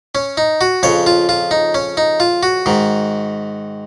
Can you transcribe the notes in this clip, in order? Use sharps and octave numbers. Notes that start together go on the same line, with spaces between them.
C#4
D#4
F#4
F2 C#3 C#5
F4
F4
D#4
C#4
D#4
F4
F#4
G#2 D#3